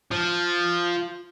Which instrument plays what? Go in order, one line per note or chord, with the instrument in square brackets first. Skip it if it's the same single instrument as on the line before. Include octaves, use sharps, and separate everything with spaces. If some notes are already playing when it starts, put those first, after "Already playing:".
[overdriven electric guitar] F3